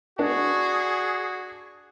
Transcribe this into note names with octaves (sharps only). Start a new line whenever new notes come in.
D4 F#4 G#4